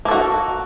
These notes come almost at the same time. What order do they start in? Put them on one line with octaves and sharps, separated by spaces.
A#3 A4 F#4